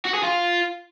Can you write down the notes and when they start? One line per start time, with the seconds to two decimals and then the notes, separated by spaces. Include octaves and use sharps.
0.05 F#4
0.14 G#4
0.23 F4